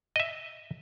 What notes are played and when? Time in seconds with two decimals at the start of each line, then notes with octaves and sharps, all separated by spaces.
0.16 D#5 E5